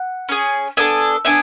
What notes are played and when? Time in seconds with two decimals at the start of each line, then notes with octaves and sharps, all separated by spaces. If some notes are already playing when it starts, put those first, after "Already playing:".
Already playing: F#5
0.29 C#4 G#4
0.77 B3 D4 A4 E5 G#5
1.25 B3 D4 E5 G#5